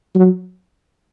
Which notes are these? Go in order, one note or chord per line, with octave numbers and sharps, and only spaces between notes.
F#3